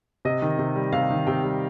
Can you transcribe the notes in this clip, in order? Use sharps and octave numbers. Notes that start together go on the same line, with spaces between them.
C3 D#5
D#3
C3
G3
C3 F5
D#3
C3 G5
G3